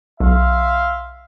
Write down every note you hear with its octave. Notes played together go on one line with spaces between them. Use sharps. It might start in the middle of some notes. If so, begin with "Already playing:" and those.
B1 E5 F5 C6